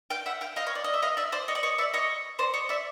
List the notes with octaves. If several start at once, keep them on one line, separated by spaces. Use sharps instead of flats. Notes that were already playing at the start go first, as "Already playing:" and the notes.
F5 G5
E5 F#5
F5 G5
D#5 F5
C#5
D5
D#5
E5
D#5 F5
D5 E5
C5 D5
C#5 D#5
D5
C#5 D#5
D5 E5
C#5 D#5
C5 D5
C#5 D#5
D5 E5